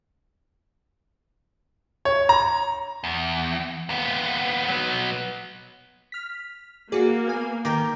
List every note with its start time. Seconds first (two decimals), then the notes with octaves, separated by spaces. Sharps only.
2.05 C#5
2.29 A#5
3.04 E2
3.89 D#2 B3
4.68 F#3 B3
6.12 F6 B6
6.92 A#3 F#4 G#4 D5
7.28 B3 G#5
7.65 D#3 A#4 D6 G6